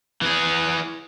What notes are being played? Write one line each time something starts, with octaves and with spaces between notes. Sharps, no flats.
E3 G#4